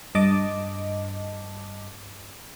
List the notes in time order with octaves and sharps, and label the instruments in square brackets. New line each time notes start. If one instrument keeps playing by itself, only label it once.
[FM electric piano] G2 D#5 A5 D6